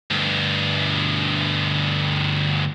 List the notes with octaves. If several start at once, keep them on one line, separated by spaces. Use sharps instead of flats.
D2 G2